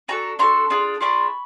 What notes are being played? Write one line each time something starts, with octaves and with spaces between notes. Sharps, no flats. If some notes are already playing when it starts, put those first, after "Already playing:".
D4 F#4 A4 G#5 A#5
D4 F#4 A4 A#5 C6
D4 F4 G#4
D4 F4 G#4 B5 C#6